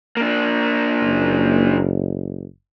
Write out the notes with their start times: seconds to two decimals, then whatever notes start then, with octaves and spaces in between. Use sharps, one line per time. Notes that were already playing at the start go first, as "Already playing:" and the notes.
0.17 A#3 D4
1.02 F#1